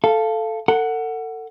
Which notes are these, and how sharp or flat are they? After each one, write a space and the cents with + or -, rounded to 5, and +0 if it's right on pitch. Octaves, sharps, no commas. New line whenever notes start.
A4 +0 F5 -15
A4 +35 F#5 +0